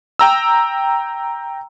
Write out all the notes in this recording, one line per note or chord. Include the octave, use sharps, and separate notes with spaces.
G5 A#5 E6